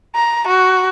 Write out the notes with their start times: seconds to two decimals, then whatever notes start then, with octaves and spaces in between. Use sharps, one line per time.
0.15 A#5
0.47 F#4